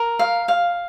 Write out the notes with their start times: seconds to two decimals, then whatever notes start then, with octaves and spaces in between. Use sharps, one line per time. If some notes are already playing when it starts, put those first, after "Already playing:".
Already playing: A#4
0.19 F5
0.48 F5